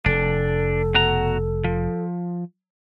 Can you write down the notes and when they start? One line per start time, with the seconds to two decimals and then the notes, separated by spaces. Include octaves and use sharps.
0.06 F1 D4 A4
0.94 B2 F#4 A#5
1.64 F3